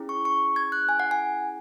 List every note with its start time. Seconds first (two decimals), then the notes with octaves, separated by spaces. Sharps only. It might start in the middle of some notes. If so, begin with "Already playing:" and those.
Already playing: C#4 E4 G#4
0.09 C#6
0.25 C#6
0.56 G#6
0.72 F#6
0.89 G#5
1.00 F#5
1.11 G#5